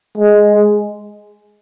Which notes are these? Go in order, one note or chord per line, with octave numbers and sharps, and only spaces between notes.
G#3